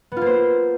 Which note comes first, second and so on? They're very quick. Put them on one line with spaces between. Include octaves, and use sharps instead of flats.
B3 F4 A#3 C5